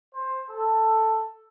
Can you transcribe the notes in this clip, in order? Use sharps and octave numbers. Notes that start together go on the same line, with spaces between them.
C5
A4